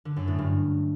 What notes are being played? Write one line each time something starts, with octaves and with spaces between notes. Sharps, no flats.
D3
F#2
A2
G2